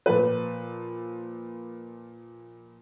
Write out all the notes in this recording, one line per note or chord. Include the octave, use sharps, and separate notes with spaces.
A#2 F3 B4